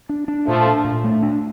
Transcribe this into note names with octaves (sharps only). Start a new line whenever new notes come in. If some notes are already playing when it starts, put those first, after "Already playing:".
D4
D4
A#2 F3 A3
D4
A#2
A3
D4